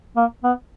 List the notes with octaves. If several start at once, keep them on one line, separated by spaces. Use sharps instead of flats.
A#3
B3